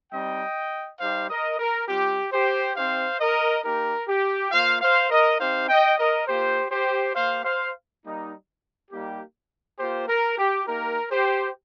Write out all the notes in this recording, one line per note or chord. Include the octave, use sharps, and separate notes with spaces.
G3 C4 D#4 D#5 G5
G3 D#4 G4 C5 F5
A#4 D#5
A#4
G3 C4 F4 G4
G4 C5
C4 D#4 G4 C5 F5
A#4 D#5
A#3 D#4 G4 A#4
G4
A#3 F4 C5 F5
C5 F5
A#4 D#5
C4 D#4 G4 C5 F5
D#5 G5
A#4 D#5
A#3 F4 G4 C5
G4 C5
A#3 G4 C5 F5
C5 F5
G3 A#3 D#4
G3 A#3 D#4 G4
A#3 F4 G4 C5
A#4
G4
A#3 D#4 G4 A#4
G4 C5